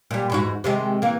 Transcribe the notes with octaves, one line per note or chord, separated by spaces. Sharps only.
A#2 G3
E2 G#2 F#4
C3 D#3 G#3
E3 A#3